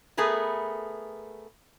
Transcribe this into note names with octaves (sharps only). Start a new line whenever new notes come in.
A3 B3 G#4 A#4 B4